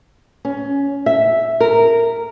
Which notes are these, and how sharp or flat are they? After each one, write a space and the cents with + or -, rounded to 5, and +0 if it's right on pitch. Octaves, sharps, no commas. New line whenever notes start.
C#4 +15
E5 +0
A#4 -10